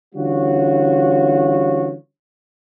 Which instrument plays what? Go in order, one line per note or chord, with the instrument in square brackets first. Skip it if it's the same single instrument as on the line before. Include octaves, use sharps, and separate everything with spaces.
[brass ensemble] D3 E3 G3 C#4 F4 F#4